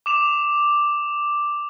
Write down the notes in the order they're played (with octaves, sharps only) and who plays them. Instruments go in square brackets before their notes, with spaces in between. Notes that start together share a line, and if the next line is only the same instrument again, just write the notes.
[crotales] D6 E7 F7